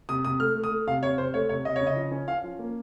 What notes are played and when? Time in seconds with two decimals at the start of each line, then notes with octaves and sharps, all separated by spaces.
0.09 C3 D#6
0.25 C3 D#6
0.40 A3 F6
0.55 A3
0.64 D#6
0.71 A3
0.87 C3 F5
1.03 C3 C#5
1.18 C3 C5
1.34 A3 C#5
1.49 C3 C#5
1.65 C3 D#5
1.76 C#5
1.81 C#3
1.87 D#5
1.96 F3
2.11 C#4
2.28 C#4 F5
2.44 F3
2.59 A#3